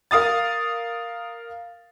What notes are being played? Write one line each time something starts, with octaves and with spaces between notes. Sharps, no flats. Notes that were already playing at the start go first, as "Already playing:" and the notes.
A#4 F5 D#6 A6